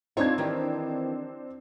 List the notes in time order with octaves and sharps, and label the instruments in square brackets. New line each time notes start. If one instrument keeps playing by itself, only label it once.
[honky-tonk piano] C4 D4 G#6 [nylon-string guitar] D#4 F4 C#5
[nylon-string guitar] D#3 E3 G4